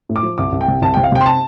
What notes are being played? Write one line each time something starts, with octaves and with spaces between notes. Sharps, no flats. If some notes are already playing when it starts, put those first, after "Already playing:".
A2
D6
F3
C2 D6
C2
G5
C3
C2 A5
G5
C3
F5
C3 G5
C6
A5